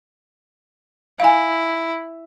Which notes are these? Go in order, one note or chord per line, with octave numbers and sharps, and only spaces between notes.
E4 F5 G#5